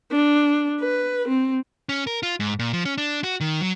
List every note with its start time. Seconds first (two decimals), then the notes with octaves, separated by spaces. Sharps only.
0.11 D4
0.80 B4
1.28 C4
1.89 C#4
2.07 A#4
2.23 F4
2.40 G#2
2.59 A#2
2.73 F3
2.85 C#4
2.98 D4
3.24 F#4
3.40 D#3
3.61 F#3